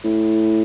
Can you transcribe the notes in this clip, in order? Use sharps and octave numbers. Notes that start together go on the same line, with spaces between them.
A2